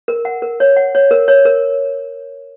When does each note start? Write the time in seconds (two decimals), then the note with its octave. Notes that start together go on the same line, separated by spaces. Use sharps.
0.08 A#4
0.25 F#5
0.42 A#4
0.60 C#5
0.76 F#5
0.95 C#5
1.11 A#4
1.28 C#5
1.45 A#4